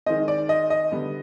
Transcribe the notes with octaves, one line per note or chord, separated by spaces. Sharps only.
D#3 G#3 C4 D#5
D5
D#5
D#5
D3 G3 B3